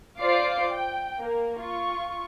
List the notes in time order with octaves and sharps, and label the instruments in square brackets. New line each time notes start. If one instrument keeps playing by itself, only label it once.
[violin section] F4 C5 D5 F5 D6 C7
G5
A#3 A#4
F4 C#6